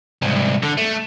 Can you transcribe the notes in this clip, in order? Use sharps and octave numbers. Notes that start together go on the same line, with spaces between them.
C2 G#2
D3
A3